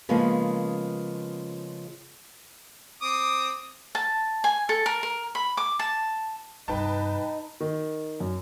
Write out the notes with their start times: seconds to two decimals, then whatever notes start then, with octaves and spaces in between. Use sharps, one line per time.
0.09 C#3 F3 G#3 A#3 B3 C#4
3.02 C4 D6 D#6
3.95 A5
4.44 G#5
4.69 A4
4.86 A#4
5.03 A#4
5.35 B5
5.57 D6
5.79 A5
6.68 G2 C3 D#4 B4 D#5 G5 A5
7.60 D#3
8.20 F#2